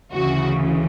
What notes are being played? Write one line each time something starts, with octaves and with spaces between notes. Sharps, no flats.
D2 C#3 E3 F#4